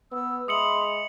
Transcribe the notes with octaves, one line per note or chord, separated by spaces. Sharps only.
B3 E6
G#3 E5 B5 C6 D#6 C#7 F#7